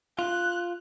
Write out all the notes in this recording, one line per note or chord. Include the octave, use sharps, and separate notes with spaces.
F4 F#6